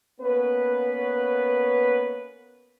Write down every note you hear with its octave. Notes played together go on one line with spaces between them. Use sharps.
A#3 B3 C#4 B4